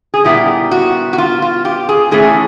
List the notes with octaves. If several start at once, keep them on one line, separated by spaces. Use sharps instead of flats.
G#4
A#2 G3 B3 E4 G4
F#4
F#4
F4
F4
G4
G#4
A2 E3 A3 C#4 G#4